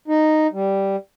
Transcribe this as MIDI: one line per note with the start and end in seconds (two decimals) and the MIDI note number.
0.08 0.47 63
0.53 0.96 55